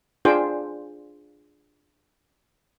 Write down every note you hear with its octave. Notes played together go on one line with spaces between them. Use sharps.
D4 F4 G#4 C5 G5